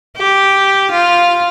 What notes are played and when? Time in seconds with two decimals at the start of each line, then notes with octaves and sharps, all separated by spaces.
0.17 G4
0.91 F4